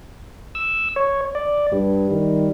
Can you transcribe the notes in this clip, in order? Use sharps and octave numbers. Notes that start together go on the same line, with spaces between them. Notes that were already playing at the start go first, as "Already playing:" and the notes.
E6
C#5
D5
G2 G3
D#3